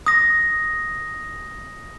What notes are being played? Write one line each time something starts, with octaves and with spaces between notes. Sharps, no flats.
D#6 A#6